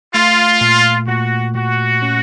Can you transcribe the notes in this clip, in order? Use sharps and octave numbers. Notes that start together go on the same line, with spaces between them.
A3 F4
A#2
A#2 F#4
A#2 F#4
C#4